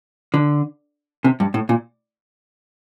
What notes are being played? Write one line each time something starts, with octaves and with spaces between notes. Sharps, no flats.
D3
C3
G2
A2
A#2